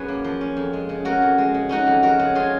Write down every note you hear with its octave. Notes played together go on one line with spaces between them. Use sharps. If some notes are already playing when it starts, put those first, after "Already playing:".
Already playing: F#2 C#4 G#4 B4 C#5
A#3
F3
C#4
F2
G#3
C#3
C#4 F#4 A#4
F2
G#3
C#3
C#4 D#4 F#4
F2
G#3 F#4 A#4
C#3
C#4 F4 G#4